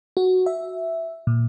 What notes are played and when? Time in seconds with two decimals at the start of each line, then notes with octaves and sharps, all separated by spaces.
0.17 F#4
0.46 E5
1.27 A#2